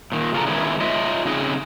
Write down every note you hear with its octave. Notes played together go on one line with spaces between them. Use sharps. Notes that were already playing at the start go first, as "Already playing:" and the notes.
A#2 D#3
C#3 F4 A4 A#5
D3 D#3 G#3 B3 C#4 E4
F4 C#5 D#5 E5
C#3 C4 D#4 G#4 D#5